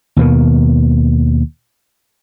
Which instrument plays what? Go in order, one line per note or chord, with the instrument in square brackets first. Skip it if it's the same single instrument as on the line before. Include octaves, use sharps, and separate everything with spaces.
[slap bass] D#2 B2 D#3